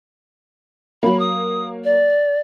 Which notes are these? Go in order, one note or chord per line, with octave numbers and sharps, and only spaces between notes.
F#3 A#3 B5
D#6
D5